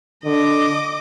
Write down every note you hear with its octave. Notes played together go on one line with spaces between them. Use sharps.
D3 D#5 D6